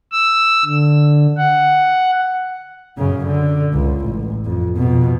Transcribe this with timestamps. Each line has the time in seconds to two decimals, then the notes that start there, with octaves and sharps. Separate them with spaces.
0.12 E6
0.65 D3
1.37 F#5
2.98 F#2 C#3
3.26 D3
3.73 C#2
4.06 A1
4.45 F2
4.77 F2 B2